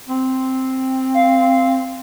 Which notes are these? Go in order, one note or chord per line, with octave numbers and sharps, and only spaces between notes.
C4
F5